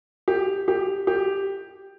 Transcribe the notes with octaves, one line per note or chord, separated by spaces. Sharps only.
G4
G4
G4